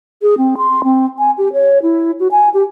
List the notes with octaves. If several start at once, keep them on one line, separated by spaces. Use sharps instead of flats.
G#4
C4
C6
C4
G#5
G4
C#5
E4
F#4
G#5
G4